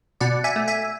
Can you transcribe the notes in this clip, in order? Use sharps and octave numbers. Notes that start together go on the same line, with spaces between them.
B2 D5 F#5
E5 G#5
A3
E5 G#5